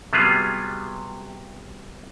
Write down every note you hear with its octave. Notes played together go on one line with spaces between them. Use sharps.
C3 F#3 G3 B3 F4 G#4